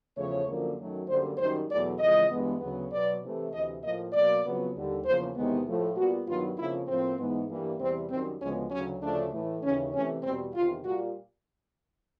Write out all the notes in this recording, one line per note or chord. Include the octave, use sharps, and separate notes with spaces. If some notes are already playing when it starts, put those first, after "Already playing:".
E2 C#3 F3 A3 C#5
F#2 D3 F3 A#3
F#2 D#3 F#3 A3
F#2 D3 G3 A#3 C5
F#2 D#3 G3 C5
E2 B2 F#3 A3 D5
F2 C#3 E3 G#3 D#5
G2 E3 G#3 B3
D2 C#3 F#3 B3
B2 F#3 B3 D5
C3 E3 A3
D2 C3 E3 D#5
A2 F3 A#3 D#5
B2 F#3 A#3 D5
F2 C#3 F#3 B3
D#2 D3 G3
E2 C#3 F3 A#3 C5
E2 C3 D#3 G#3 B3
A2 F3 A3
A#2 G3 B3 F#4
G2 D#3 F#3 B3 F4
F2 C#3 F3 A#3 E4
A2 F3 A#3 C4
G#2 E3 G#3 B3
G2 E3 G3 A#3
E2 C3 E3 G3 C4
F#2 D#3 G3 C4
D2 C#3 F3 G#3 B3 C#4
D2 C#3 F#3 C#4
D2 C#3 F3 A3 D4
A2 E3 A3
D#2 C#3 E3 C#4
C3 E3 A3 C#4
E2 B2 G3 C4
E2 C3 D#3 F4
A#2 G3 A#3 F#4